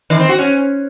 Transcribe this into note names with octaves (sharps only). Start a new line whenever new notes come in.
D#3
C4
F#4
C#4